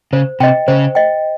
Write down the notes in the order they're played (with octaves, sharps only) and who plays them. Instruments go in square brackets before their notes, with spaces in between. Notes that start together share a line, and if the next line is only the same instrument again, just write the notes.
[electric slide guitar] C#3 [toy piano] C5
[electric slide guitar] C3 [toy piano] D#5 G5
[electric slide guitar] C#3 [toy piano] C5
[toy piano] D#5 G5